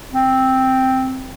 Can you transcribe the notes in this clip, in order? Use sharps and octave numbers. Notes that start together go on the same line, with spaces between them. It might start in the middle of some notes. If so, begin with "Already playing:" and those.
C4